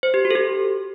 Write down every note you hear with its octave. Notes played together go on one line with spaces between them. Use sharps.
C5
G4
F#4
A4
G4